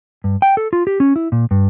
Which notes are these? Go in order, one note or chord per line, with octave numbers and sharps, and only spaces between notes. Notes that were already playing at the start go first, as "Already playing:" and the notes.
G2
G5
A4
F4
G4
C#4
E4
A#2
G2